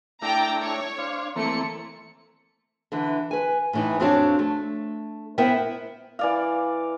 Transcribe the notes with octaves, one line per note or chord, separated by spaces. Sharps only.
A3 D4 E4 G5 A5 A#5
C#5
D4 C5 F5
E3 A3 A#3 C4 C#7
D3 E3
B4 G#5
A2 E3 D#4
F2 C4 D4 F#4 C#5 F5
A3
B3 E4 A#4 C5 E5 G5
E3 D5 F5